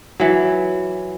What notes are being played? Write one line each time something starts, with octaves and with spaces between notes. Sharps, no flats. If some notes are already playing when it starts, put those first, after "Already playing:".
E3 F#3